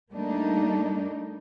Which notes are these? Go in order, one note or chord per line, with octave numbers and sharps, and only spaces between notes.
G3 A3 A#3 D4 D#4